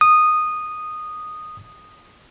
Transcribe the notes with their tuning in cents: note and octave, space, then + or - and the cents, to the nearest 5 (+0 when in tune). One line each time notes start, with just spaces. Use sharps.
D#6 -10